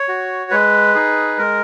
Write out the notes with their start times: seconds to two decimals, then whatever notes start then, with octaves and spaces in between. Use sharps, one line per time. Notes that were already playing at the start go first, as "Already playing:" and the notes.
Already playing: C#5
0.08 F#4
0.51 G#3 B4
0.94 D#4 G#4
1.38 G#3 A#4